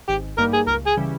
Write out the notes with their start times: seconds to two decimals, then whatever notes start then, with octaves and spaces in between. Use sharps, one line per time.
0.09 G#1 G4
0.38 G2 D#3 G3 A#3 A#4
0.53 G#4
0.67 C#2 A#4
0.87 G#4
0.97 C#3 E3 G3